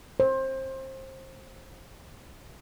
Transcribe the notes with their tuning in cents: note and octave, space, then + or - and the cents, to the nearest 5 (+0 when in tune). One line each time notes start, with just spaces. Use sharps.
C5 +25